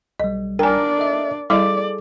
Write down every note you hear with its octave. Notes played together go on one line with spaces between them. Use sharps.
B1 G3 D#5
D4 A#4 D5 G5 G#5
A4 D#5 E5
G3 E4 G#4 A4 D5 D#5 D6